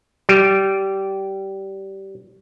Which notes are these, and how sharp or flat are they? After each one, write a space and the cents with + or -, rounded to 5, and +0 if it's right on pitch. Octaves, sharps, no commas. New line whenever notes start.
G3 -20